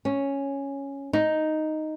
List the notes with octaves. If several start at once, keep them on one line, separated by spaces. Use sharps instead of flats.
C#4
D#4